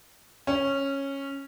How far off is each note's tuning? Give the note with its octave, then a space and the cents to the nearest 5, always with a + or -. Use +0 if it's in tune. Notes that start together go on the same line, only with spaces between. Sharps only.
C#4 -10